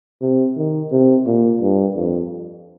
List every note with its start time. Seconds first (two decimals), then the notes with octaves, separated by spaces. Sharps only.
0.22 C3
0.57 D#3
0.92 C3
1.26 A#2
1.62 G2
1.95 F2